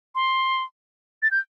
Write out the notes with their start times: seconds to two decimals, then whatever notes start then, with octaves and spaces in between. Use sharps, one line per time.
0.15 C6
1.22 A6
1.31 G6